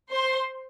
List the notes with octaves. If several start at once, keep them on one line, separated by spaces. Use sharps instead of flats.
C5 C6